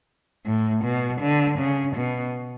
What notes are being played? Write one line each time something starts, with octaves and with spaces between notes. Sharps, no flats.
A2
B2
D3
C#3
B2